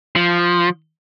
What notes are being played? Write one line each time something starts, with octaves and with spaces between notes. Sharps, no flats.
F3